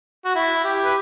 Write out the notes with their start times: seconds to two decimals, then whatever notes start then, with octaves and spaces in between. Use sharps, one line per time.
0.25 F#4
0.36 E4
0.65 G4
0.84 B4